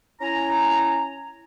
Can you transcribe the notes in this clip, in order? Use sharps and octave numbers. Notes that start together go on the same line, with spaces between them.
C#4 E4 G#5 A#5